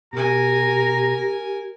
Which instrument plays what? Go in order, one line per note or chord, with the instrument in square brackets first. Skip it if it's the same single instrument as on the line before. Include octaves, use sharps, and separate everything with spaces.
[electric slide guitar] B2 [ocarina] G4 [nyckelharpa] A#4 G#5 [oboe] A#5